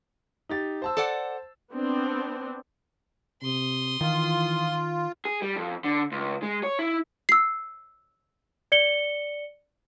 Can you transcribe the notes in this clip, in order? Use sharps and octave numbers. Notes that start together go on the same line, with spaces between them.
D#4 G4 A6
C5 A5 E6
A4 D5 F#5
B3 C4 D4
C3 C6 D#6
D#3 E3 F4
G#4
G3
F2
D3
C#2
G#3
C#5
E4
E6 C7
D5 C#7 G7